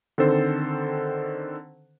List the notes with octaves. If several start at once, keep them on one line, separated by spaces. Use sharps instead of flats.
D3 D#3 C4 A4 C5